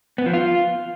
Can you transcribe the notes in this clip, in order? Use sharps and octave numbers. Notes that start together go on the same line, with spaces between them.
B3
F3
F4